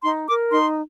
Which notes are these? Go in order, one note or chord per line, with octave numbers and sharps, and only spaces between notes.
D#4 C6
A#4 D6
D#4 C6